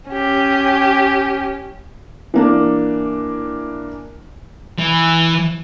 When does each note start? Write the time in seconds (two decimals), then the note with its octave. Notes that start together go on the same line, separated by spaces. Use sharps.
0.11 C#4 G4
2.34 E3 A#3 D4
4.79 E3